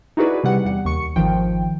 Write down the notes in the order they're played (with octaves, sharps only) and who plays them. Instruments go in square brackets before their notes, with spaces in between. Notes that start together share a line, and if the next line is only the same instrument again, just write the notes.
[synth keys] D#4 E4 F#4 G#4 B4 D5
C3 G3 F#5
E2 G3 F#5
D#2 C#6 C#7
G#1 D#3 F3 G5